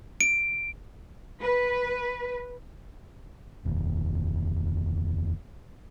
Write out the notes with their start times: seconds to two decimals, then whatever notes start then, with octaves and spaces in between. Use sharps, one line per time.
0.21 D7
1.42 B4
3.65 F1 D#2